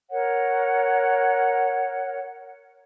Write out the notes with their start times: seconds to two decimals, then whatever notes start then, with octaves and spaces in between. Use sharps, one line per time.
0.10 A#4 C#5 F#5